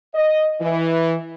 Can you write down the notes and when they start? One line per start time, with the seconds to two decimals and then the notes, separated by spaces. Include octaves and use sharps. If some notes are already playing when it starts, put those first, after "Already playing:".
0.14 D#5
0.61 E3